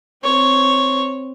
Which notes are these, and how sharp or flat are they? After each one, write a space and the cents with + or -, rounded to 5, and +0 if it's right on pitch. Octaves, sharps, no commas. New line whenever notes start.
C4 +0 C#5 +0